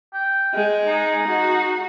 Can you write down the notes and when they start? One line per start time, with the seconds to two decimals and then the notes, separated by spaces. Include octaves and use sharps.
0.14 G5
0.54 G#3
0.86 D#4
1.28 F#4